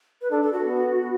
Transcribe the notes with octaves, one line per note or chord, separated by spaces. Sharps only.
B4
D4 A4
A4
F#4
B3